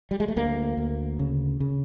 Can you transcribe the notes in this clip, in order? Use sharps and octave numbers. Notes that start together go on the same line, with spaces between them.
G3
G#3
A3
D2 A#3
D2
C#3
C#3